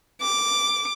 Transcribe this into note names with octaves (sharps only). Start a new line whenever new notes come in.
D6